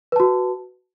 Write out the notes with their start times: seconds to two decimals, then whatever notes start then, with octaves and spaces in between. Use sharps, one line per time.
0.12 B4
0.16 A5
0.20 F#4